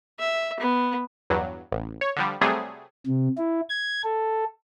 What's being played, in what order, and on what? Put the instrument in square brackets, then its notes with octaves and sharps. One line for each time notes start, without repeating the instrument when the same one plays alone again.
[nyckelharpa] E5
B3
[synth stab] E2 G2 F#3
A1
C#5
D3 F3 G3
C3 F#3 G3 A3 G#4
[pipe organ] C3
E4
G#6
A4